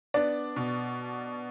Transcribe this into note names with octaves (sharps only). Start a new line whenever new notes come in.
B3 D4 D5
B2